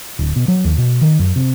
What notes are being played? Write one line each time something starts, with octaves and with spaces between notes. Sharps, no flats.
D1
B2
F#3
D#2
B2
D#3
F#2
C3